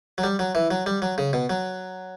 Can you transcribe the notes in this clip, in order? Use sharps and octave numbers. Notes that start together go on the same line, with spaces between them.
F#3
G3
F#3
E3
F#3
G3
F#3
C#3
B2
F#3